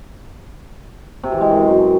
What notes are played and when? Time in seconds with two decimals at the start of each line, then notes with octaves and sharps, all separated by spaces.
1.23 C3
1.32 E3
1.41 G#3
1.50 F#2